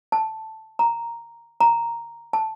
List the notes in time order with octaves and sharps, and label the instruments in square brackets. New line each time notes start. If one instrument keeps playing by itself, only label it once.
[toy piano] A5
A#5
A#5
A5